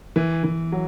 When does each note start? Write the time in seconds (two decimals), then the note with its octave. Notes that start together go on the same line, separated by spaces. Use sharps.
0.16 E3
0.44 E3
0.72 F#3